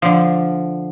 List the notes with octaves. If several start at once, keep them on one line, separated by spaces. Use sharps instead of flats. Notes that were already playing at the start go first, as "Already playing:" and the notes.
D3 F3